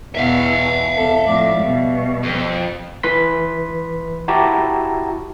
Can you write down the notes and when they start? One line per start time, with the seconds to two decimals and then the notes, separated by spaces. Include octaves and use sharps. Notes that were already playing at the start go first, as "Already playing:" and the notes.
0.15 E2 B2 E3 E5 F5
0.94 E2 C3 A4
1.25 F2 A2 D5
1.58 B2 G3
2.23 F2
3.03 E3 B4 C6 B6
4.28 E4 F#4 G4 A5 A#5